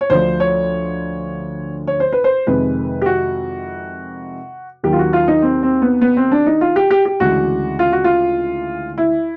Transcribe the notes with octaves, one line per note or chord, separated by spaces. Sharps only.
C#5
D2 D3 F3 C5
C#5
C#5
C5
B4
C5
F2 C3 D#3 G#3 B4
G4
F#4
D#2 D#3 F#3 G4
F4
F#4
F4
D#4
C4
C4
B3
B3
C4
D4
D#4
F4
G4
G4
G4
D2 C#3 E3 G#3 F#4
F4
F#4
F4
E4